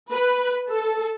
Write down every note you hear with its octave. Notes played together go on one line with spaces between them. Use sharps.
B4
A4